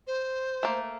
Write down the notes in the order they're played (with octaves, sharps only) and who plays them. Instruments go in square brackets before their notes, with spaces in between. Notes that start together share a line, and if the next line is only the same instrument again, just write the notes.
[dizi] C5
[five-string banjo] A3 A#3